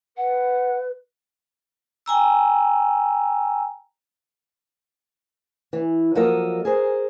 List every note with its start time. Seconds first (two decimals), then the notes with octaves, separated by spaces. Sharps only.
0.17 B4 F#5
2.06 G5 G#5 A#5 E6
5.73 E3
6.15 F3 F#3 A#3 A4 A#4 D#5
6.65 G#4 A#4 C5